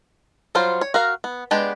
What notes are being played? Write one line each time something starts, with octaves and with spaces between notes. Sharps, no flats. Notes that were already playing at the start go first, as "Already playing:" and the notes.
F#3 G3 F4 C5
C#5
F#4 A#4 F5
B3
G#3 B3 D4 G4 D5